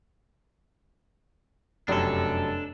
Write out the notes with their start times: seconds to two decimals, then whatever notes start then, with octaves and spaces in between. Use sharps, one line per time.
1.88 F1 F#2 D4 G4 A4